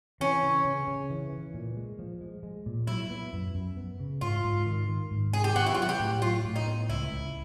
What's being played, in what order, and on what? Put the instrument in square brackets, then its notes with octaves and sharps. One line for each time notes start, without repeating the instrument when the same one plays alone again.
[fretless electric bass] E3 [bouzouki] C#4
[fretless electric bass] C#3
C#3
C#3
E3
E3
A#2
G#3
F3
G#3
G#3
A#2
[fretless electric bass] F#3 [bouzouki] E4
[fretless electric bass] B3
F#2
F#2
B3
C#3
[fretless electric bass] G#2 [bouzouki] F4
[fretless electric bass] G#2
D#3
D#3
G#2
[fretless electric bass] D#3 [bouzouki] G#4
[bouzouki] G4
[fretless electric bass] B3 [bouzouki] F#4
[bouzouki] E4
F4
[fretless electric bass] F#3 [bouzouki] F#4
[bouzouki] G4
[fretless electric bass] A2
[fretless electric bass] F#3 [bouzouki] F4
[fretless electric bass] A2
[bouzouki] D#4
[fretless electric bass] B3
[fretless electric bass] C#2 [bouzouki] E4
[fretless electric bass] C#2